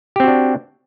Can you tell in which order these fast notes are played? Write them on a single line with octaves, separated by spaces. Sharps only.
G4 C4 F#4 D4